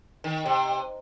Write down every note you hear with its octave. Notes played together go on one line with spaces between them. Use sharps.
D#3
C3